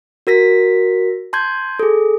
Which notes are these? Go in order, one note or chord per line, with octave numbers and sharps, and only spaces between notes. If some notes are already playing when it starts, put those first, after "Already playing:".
F#4 A#4 A#6 B6
A5 C6 G6 G#6
G#4 A4